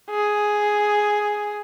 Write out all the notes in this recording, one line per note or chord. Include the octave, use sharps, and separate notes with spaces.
G#4